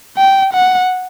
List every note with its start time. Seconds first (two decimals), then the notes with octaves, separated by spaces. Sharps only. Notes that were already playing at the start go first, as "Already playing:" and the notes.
0.17 G5
0.53 F#5